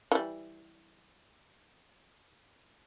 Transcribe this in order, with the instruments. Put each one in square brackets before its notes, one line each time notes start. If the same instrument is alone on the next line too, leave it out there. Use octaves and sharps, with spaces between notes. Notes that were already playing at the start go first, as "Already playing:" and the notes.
[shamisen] E3 G3